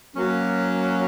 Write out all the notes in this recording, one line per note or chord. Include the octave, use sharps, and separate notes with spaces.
F#3 A#3 C#4